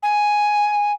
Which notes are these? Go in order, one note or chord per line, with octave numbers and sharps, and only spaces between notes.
G#5